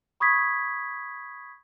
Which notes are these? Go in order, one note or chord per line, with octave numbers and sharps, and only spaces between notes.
B5 C#6 D#6 G#6 B6